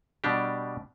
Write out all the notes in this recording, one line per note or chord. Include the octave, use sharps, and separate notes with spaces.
B2 G3 D4 G4